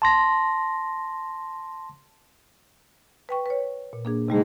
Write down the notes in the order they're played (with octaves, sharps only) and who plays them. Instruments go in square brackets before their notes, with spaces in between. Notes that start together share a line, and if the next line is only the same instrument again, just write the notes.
[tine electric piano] A5 C6 A#6
[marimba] B4 G5 C#6
B4 C#5
A#2
A#3 D4 G#4
[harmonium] G#2 [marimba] C3 G3 A3